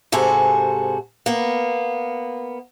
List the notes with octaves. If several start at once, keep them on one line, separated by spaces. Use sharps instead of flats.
G#2 C3 F#4 A4 G#5
A#3 B3